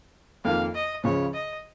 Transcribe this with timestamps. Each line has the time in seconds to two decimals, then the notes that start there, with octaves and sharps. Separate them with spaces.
0.44 F2 D#3 A#3 F4 F5
0.75 D#5
1.04 C#2 C#3 F3 C#5
1.34 D#5